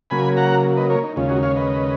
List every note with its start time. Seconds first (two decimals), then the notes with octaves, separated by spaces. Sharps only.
0.10 C#3 F#3 A#3 G#5 B5
0.37 F#5 A#5
0.76 B4 D#5
0.90 A#4 C#5
1.04 D#4
1.16 D#2 C#3 G#3 C#4 F4
1.29 D#4 F#4
1.43 C#5 F5
1.56 B4 D#5